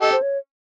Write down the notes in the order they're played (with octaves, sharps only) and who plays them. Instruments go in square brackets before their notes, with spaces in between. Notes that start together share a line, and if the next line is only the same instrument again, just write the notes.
[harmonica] G4 A4 [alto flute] D#5
[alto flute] C5
C#5